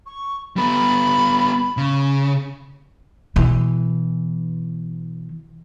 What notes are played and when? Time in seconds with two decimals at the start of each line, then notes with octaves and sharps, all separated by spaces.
0.06 C#6
0.56 G3 B3 B5
1.77 C#3
3.36 B2 E3